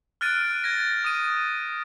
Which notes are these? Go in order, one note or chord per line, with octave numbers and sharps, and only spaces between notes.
F6 F#6 A6 D7 D#7
G#6 A#6
D#6 D#7